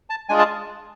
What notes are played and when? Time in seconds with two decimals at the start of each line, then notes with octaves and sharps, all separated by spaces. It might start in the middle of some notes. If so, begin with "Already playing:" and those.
0.10 A5
0.29 G#3 D4 F4 G#4 G#5
0.39 A5